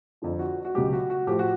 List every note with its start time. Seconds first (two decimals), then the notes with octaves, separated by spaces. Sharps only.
0.22 F2 D3 F3
0.39 F#4
0.65 F#4
0.75 C#2 B2 F#3 G4
0.93 F#4
1.10 F#4
1.27 A2 F3 G4
1.39 F#4